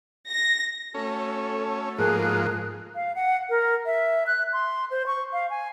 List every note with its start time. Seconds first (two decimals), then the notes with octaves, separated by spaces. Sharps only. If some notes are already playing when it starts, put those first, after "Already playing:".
0.29 A#6
0.94 A3 C#4 F#4 A4
1.98 G#2 F3 A#3 G#4 A#4 F#6
2.95 F5
3.15 F#5
3.50 A#4
3.86 E5
4.27 F#6
4.53 C6
4.91 C5
5.07 C#6
5.33 F5
5.50 G#5